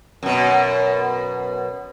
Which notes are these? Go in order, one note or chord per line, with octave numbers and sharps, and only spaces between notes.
F#2 B2